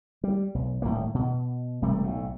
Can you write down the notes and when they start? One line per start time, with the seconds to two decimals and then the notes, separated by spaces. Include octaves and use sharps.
0.24 G3
0.55 B1
0.82 D#1 A2 D#3 A#3
1.14 B2
1.82 E1 C3 G3 A3
2.03 B1 A2